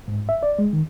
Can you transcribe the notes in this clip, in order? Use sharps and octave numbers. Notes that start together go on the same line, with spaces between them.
G#2
E5
D5
G#3
D#3